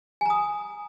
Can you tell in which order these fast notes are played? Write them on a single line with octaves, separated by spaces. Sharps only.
G#5 A#5 D#6